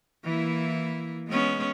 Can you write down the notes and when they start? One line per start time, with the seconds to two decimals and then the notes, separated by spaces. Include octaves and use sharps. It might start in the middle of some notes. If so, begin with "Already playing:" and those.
0.24 E3 A#3 E4
1.28 G#3 B3 C#4